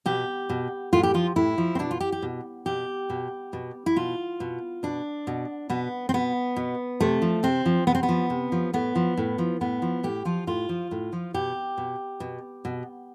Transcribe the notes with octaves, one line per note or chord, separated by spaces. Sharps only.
B2 G4
B2
A2 F4
G4
F3 F4
A2 E4
F3
C4
B2 D4
F4
G4
G4
B2
B2 G4
B2
B2
E4
B2 F4
B2
B2 D4
B2
B2 B3
C4
B2 B3
B2
C3 A3
F3
C3 C4
F3
C3 B3
C4
B3
F3
C3
F3
A2 B3
F3
A2
F3
A2 B3
F3
A2 G4
F3 F4
A2 F4
F3
A2
F3
B2 G4
B2
B2
B2